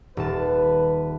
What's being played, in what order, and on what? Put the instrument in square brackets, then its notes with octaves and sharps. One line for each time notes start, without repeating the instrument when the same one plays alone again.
[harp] D#1 A5 [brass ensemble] B4